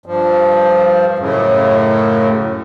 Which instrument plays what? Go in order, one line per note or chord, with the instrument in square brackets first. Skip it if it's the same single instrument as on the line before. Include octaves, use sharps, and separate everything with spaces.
[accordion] G2 F3
F#2 A2 C#3